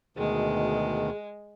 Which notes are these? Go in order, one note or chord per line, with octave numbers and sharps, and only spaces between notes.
D2 B2 D#3 G#3 G#4